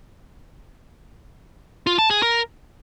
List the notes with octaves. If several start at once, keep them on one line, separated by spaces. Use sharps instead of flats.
F4
A5
G#4
A#4